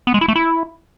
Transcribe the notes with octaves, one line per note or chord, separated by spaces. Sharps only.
B3
G#3
E4
A3
E4